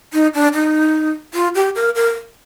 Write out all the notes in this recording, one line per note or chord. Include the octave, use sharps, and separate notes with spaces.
D#4
D4
D#4
F4
G4
A#4
A#4